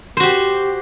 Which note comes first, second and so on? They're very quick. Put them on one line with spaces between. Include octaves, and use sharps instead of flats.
C5 F#4 G4